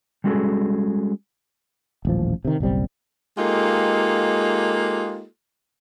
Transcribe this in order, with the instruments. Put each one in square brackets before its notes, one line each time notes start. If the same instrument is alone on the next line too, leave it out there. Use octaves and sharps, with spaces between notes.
[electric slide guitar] G3 G#3 C#4 F#4 G#4 A4
[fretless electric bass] D#1 A1 F3
C3 D#3
F#1 B1 G3 C4
[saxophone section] G#3 A#3 D#4 F4 G4 A4